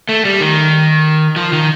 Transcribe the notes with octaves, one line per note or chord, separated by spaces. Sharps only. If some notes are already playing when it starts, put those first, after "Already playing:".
A3
G3
D#3
F3
D#3